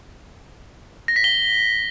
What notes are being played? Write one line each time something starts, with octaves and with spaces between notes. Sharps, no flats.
A#6
B6
G7